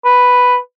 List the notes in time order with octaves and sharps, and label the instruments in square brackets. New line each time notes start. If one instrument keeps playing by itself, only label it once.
[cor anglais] B4